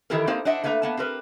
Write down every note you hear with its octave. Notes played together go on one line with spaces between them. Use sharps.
D#3 E3 E4 G4 A4 A#4
A#3 C4 D#4 G4 A#4 C5
D4 C5 D#5 E5 F#5
A3 A#3 B4 E5 A#5
A#3 B3 A5
C4 G4 A#4 B4